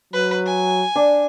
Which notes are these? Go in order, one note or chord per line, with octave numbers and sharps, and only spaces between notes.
F#3 B4
G#5
D4